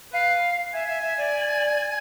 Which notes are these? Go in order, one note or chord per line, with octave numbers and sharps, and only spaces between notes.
B4 F5
E5 G#5
E5
E5
D5